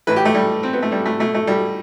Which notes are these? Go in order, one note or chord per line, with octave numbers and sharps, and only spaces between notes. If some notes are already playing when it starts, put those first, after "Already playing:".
A2 E3 B4
G4
A3
G3
C4
B3
A3
G3
A3
B2 A3
A3
G3